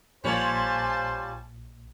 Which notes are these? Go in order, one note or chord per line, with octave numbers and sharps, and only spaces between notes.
A#1 A#2 G3 F4 C5 C#5 G#5 A5